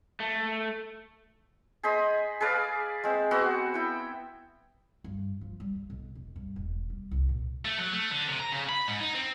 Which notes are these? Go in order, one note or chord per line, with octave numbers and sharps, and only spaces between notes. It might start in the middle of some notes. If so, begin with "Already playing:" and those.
A3
G#4 C5 D#5 B5
G#4 B4 D5 F5
G#3 C4
B3 C4 F#4 F#5
E4 G5
G2
F3
G3
G2
B1
E1
G2
E1
G3
C2
A#2
A3
F#3
A3
D3
C3
A#5
C#3
B5
G#2
D#4
C4